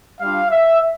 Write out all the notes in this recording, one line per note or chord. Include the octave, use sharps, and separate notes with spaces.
G3 D4 F4 F5
E5